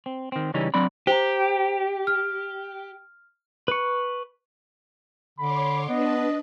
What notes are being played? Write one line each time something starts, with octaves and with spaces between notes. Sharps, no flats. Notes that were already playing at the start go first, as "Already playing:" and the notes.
C4
D#3 C4
C#3 E3 G3 C#4 D#4
F#3 C4 D4 D5 B5
G4 C5 A#5
F6
B4 C#6
D3 C#5 B5 C6 D6
B3 D4 B4 D#5 A5